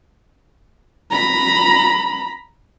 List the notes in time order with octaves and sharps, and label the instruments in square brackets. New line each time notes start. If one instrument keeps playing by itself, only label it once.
[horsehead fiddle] A#5 B5